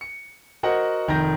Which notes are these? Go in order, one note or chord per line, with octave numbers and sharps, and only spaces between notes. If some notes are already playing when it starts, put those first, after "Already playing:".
C#7
F#4 A#4 C5 D#5 F#5
F1 D#3 A#5 G6 A#6